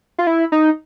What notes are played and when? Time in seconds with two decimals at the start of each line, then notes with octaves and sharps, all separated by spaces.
0.18 F4
0.27 E4
0.52 D#4